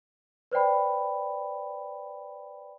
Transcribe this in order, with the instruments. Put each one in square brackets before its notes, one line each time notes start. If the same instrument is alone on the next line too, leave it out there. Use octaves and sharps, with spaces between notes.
[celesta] B4 C5 D5 G5 B5